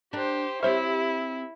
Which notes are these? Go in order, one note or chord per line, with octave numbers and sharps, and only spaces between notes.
D4 G4 A#4 C5
C4 E4 G4 C5 C#5 E5 F6